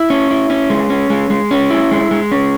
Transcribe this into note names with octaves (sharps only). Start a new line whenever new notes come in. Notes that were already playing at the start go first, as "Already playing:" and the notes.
Already playing: E4
C#4
E4
C#4
G#3
C#4
G#3
G#3
C#4
E4
G#3
G#3
C#4